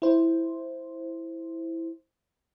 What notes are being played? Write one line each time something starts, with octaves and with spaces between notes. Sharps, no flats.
E4 C5